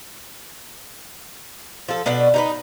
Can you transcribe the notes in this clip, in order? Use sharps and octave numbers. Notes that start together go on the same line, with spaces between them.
F3 A4
B2 D4 B4 F#5
D#4 G4 B4